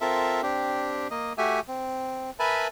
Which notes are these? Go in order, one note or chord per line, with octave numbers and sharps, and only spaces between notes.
C4 F4 A4 A#4 E5
C4 D4 G4
A#3 D#5
A3 F#4 G4 E5 G#5
C4
A#4 B4 E5 G#5 A5 B5